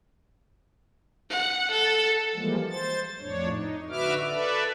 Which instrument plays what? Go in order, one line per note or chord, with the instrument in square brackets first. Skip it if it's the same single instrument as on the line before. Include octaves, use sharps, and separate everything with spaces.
[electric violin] F#5
A4
[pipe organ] E3 F3 G3 G#3 A#3
C5 A6
F2 A2 D4 C#5
D#4
D3 F#4 B4 E5 D6 F6
A4 B4 D5 E5